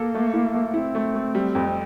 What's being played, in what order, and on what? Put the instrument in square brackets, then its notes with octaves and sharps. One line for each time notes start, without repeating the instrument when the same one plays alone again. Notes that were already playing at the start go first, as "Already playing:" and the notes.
Already playing: [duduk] A#3 [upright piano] A4
[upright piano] A3
E4
A3
[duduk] C4 [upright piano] E4
[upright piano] A3
A3
G3
F2